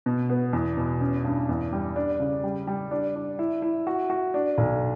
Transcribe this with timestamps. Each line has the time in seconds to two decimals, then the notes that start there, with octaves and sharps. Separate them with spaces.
0.06 B2
0.30 B3
0.53 E2
0.77 B2
1.01 C#4
1.25 G2
1.49 E2
1.73 G3
1.96 D4
2.20 C#3
2.44 G3
2.67 G3
2.91 D4
3.15 D4
3.39 E4
3.62 E4
3.87 F#4
4.10 F#4
4.34 D4
4.58 B1